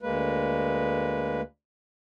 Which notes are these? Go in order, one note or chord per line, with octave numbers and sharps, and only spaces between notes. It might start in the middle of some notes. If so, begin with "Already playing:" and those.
D2 G#3 A#3 B4